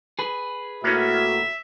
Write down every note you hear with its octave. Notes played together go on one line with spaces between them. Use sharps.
G#4 B4
A2 A#3 B3 C#4 E4 F#4 E5